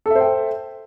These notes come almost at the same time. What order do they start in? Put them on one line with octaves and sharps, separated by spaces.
A4 E5 C5 G5